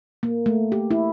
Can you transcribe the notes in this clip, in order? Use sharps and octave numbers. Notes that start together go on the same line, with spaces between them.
A#3
A3
G4
E4